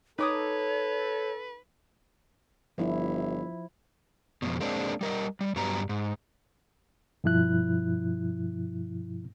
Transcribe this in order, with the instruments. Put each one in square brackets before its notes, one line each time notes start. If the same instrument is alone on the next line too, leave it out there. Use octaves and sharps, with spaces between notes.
[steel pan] D#4 D6 D#6 [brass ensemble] A4 [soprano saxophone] B4 [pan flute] C#5
[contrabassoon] G1 [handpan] F3 E4
[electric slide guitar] F2 G#2 B2
G#3 A#3 C4 D4
G3 A#4 D#5
G3
G2 F#3 G3 B3 A#5
G#2
[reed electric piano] G2 B2 F3 E4 F#6